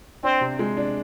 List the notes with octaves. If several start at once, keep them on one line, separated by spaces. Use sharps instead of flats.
C4 D4
C3
G#3
D4